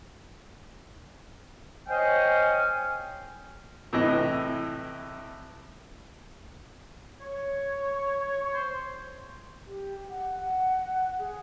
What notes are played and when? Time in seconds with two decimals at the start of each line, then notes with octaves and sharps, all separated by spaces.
1.88 C5 C#5 D#5 F5 G5 G#5
3.93 A2 C3 E3 D#5
7.21 C#5
8.54 C5
9.65 G4
10.10 F#5
10.38 F#5
11.19 G#4